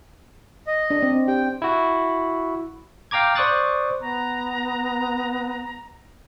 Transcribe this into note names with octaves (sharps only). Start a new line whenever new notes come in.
D#5
D4
C4
G4 G5
E4 F#4
F5 G5 A#5 D6 G#6
C5 D5 C#6 D#6 F#6 A6
B3 A#5